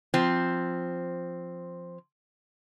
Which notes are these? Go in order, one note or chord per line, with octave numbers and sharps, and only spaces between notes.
F3 C4